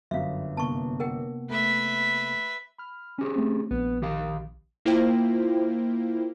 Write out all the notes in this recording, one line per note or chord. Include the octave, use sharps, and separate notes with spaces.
G1 F#2 F#3 E5 F5
C3 A#3 B3 A5 C#6
A#4 F#5 G5
A3 B4 E5
B5 F6
C#4 G4 G#4
A3 C4
A#1 B3
D#3 G4 F5
A#3 E4 F4 C5 G5